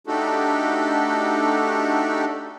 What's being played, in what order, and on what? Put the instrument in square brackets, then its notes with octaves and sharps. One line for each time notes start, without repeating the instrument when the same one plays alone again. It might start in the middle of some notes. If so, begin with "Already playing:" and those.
[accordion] A3 D4 D#4 F#4 G4 A4